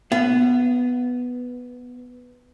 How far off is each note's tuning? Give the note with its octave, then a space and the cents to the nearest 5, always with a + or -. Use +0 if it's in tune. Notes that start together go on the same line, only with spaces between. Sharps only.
B3 +0 F5 -35